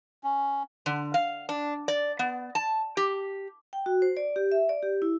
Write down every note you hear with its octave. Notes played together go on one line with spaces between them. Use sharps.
C#4
D3
F5
D4
D5
B3
A5
G4
G5
F#4
C5
D5
G4
E5
D5
G4
E4